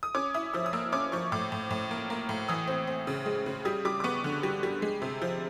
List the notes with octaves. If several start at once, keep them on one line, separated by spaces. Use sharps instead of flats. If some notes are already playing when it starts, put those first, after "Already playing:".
D#6
C#4 D6
E4 D#6
F3 E6
D#6
A#3 E6
C#4 D6
F3 C#6
A2 D6
A2
A2
A#3
A#3
A2
E3 D#6
C4
C4
C#3
G#3
C#3
G3 D#6
G3 D6
D6
B3 C#6
D3
G3
G3
G#3
C3
F3